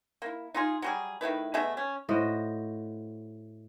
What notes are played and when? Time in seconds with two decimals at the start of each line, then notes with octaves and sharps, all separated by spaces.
0.22 A#3 E4
0.54 D#4 F4 G#4
0.82 F#3 G3 G#4
1.21 D#3 A3 E4 B4
1.54 B2 A3 G#4 E5
1.77 C#4
2.09 A2 F#4 C5 D#5